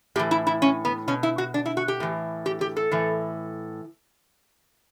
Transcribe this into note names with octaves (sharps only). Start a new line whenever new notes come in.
A2 E3 G4
E4
E4
C#4
B3
B2 C#4
E4
F#4
D4
E4
F#4
G4
A2 E3
G4
G4
A4
A2 E3